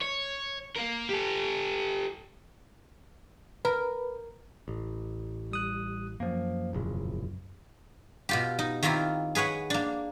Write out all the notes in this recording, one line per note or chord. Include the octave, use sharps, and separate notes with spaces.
C#5
A#3 A#4
G4 A4
A#4 B4
A1
G3 D#6 F#6
F#2 F3 A#3
E1 A#1 C#3
B2 F4 G4
D#4
D#3 A#3 C4 E4 F4
G#4 B4 C#5 F#5
A#3 D4